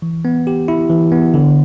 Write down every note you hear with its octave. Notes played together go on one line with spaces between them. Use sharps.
E3
B3
G4
E4
E3
B3
D3